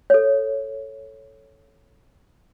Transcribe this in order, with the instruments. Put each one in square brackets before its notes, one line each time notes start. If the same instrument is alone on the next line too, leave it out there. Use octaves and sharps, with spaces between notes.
[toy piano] A4 C#5